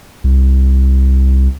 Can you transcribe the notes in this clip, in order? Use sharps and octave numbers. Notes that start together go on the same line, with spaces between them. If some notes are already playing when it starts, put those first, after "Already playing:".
C2